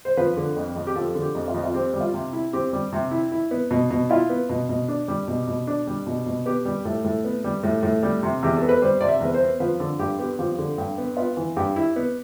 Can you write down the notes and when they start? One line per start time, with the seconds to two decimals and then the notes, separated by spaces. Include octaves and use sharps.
0.05 C5
0.17 F3 B4
0.37 D3
0.56 F2
0.76 F2
0.87 G4
0.95 F3 A4
1.15 D3
1.22 G4
1.35 F2
1.48 F4
1.54 F2
1.64 F4
1.74 C4 G4
1.94 G3
2.01 F4
2.14 C3
2.33 E4
2.53 C4 G4
2.73 G3
2.93 C3
3.11 E4
3.32 E4
3.51 B3
3.71 B2
3.91 B2
4.10 E4 F4
4.30 B3
4.49 B2
4.69 B2
4.88 D4
5.08 G3
5.28 B2
5.47 B2
5.67 D4
5.87 G3
6.07 B2
6.26 B2
6.46 B3 G4
6.65 G3
6.85 A2 A4
7.04 A2
7.24 B3
7.44 G3
7.63 A2
7.83 A2
8.03 G3
8.23 C3
8.43 E2 G4
8.57 A4
8.62 B3
8.69 B4
8.82 G3 C5
9.01 C3 D5
9.08 E5
9.21 E2 B4
9.34 C5
9.40 B3
9.60 F3 B4
9.80 D3 A4
9.99 G2 G4
10.19 B3 G4
10.39 F3 G4
10.58 D3
10.78 G2
10.98 B3
11.17 B3 F4
11.37 E3
11.56 G2 G4
11.76 E4
11.96 B3